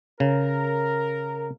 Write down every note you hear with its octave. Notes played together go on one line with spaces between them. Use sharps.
C#3 A#4